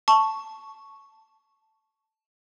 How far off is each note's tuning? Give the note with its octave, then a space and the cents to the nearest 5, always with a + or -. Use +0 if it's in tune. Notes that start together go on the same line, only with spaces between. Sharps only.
A5 +0 C#6 +0